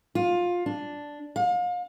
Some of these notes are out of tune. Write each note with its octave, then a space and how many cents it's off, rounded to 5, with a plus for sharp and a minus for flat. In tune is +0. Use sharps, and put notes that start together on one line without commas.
F4 +15
D4 -5
F5 +35